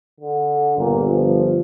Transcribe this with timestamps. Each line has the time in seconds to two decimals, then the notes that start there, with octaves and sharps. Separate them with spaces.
0.20 D3
0.78 G1 A#2
1.12 F3